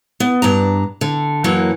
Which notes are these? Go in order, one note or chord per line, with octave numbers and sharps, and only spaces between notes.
B3
G2 D4 A#5
D3
F#2 E3 F#3 A#3 C#5